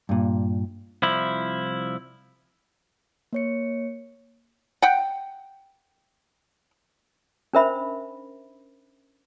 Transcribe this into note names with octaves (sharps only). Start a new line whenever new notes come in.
G2 A#2
C2 F3 E4
A#3 C#5 C#7
F#5 G5
C#4 D4 A#4 C5 E5 B5